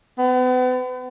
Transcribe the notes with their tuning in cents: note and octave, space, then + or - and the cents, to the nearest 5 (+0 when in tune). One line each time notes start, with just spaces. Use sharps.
B3 +40